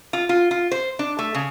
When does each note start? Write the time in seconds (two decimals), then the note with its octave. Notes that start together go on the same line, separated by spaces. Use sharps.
0.13 F4
0.29 F4
0.51 F4
0.72 C5
0.99 D4
1.19 A3
1.35 C#3